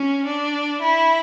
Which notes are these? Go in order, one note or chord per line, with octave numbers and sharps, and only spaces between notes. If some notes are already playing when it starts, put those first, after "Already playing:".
Already playing: C#4
D4
E4